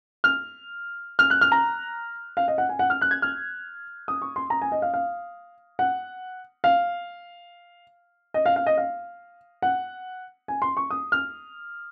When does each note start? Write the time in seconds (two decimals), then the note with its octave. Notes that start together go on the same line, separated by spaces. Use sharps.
0.24 F6
1.19 F6
1.30 F#6
1.41 F6
1.52 A#5
2.37 F5
2.48 D#5
2.58 F#5
2.69 G#5
2.79 F#5
2.90 F6
3.01 F#6
3.11 G#6
3.22 F6
4.08 D#6
4.22 C#6
4.36 C6
4.50 A#5
4.62 G#5
4.72 D#5
4.82 F5
4.94 F5
5.79 F#5
6.64 F5
8.34 D#5
8.46 F5
8.56 F5
8.67 D#5
8.77 F5
9.62 F#5
10.48 G#5
10.62 C6
10.77 C#6
10.91 D#6
11.12 F6